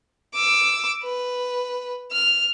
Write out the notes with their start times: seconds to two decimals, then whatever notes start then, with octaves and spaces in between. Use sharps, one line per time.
0.34 D6 E6
1.04 B4
2.12 F6